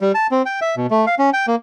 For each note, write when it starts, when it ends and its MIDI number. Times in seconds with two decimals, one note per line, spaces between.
0.01 0.12 55
0.15 0.27 81
0.31 0.42 60
0.46 0.60 79
0.61 0.75 76
0.77 0.86 47
0.91 1.05 57
1.07 1.15 77
1.19 1.30 61
1.33 1.46 79
1.47 1.55 58